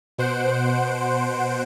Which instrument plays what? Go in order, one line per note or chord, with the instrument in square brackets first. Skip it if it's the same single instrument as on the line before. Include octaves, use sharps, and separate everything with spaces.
[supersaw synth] B2 C5 F#5 D7